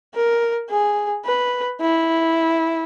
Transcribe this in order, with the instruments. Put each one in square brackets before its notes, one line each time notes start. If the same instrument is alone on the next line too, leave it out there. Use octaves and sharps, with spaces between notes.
[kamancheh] A#4
G#4
B4
E4